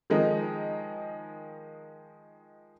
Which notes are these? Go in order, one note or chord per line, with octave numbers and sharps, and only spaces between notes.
D#3 F3 G#3 D#4